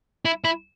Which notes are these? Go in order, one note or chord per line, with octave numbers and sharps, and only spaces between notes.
E4
E4